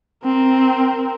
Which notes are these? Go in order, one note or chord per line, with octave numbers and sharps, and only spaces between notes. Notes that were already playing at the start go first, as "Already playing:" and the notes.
C4 A#4